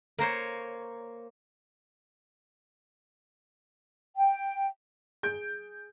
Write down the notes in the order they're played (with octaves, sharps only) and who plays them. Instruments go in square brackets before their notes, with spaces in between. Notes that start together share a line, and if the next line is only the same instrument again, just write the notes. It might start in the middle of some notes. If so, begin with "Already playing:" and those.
[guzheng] A#3 A#4 C5 C#5
[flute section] G5
[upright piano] G#4 G6 D7